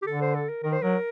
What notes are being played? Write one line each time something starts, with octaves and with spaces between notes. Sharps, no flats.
G4
D3 A4
C5
A4
A#4
D#3 A#4
C5
F#3 A#4